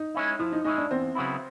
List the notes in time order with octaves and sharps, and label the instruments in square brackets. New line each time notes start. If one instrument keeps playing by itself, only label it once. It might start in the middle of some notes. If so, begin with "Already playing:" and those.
Already playing: [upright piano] D#4
[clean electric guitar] G#3 C#4 E4
[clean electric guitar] F3 [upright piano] E4
[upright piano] D#4
[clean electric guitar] G#3 C#4 E4 [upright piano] D#4
[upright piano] D4
[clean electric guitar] E2 [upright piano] C4
[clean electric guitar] C#3 F#3 B3 E4